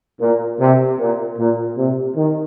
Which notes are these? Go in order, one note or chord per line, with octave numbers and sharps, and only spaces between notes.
A#2
C3
A#2
A#2
C3
D#3